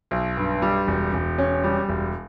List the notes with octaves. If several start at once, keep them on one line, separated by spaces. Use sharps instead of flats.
B1
G2
G3
E1
E1
C#4
G3
E1